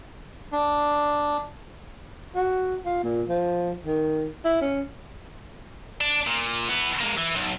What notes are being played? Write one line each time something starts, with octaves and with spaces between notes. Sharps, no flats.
D4
F#4
F4
A#2
F3
D#3
E4
C#4
D4
A#2
E3 B3
G#3 A#3
E3
B1